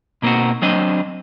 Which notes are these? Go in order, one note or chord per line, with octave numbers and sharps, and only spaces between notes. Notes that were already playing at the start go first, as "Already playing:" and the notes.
B2 A#3 C4 D#4 F#4
F#3 C4 D4 C5 D#5